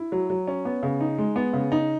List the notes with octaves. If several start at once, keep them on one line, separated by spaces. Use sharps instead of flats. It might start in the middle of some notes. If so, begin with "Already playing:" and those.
Already playing: E4
F#3
F#3
C#4
B3
C#3
D#4
G#3
B3
C#3
D#4